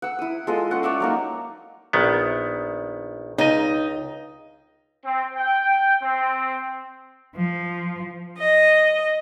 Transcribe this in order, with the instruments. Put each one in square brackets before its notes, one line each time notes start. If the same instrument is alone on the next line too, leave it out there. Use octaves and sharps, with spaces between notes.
[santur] F#5 E6
E4 D#6
G#3 F4 A4 D#5
G#3 C#4 F#5
C#5 D5 E5 F#5
F#3 A#3 D#4
[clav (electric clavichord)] A#1 D#3 B3
[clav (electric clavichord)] C#2 D#5 [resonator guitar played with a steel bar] D#4
[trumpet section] C4
G5
C4
[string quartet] F3
D#5